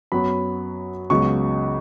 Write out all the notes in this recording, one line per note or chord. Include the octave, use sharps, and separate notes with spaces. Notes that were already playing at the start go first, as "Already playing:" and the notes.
F#2 F#3 B3 B5
C#2 C#3 F#3 B3 C#6